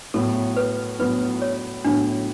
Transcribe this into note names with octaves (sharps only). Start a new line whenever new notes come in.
A2 F#3 B3 A4
B4
A2 F#3 B3 B4
C#5
A2 F#3 B3 D4